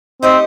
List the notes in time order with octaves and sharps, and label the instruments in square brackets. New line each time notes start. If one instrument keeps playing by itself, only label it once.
[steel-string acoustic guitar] A3 D#4 G4 C5 D#5 [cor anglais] C4